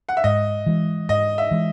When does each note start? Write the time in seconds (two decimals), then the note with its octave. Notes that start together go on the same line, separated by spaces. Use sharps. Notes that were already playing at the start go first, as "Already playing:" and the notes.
0.09 F#5
0.17 E5
0.24 G#2 D#5
0.66 E3 G#3
1.09 G#2 D#5
1.38 E5
1.51 E3 G#3